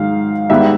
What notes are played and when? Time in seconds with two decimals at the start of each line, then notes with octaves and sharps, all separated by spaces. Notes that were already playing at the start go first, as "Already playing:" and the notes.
Already playing: G#2 D#3 F#3 F5
0.49 G#2 D#3 G3 B3 E5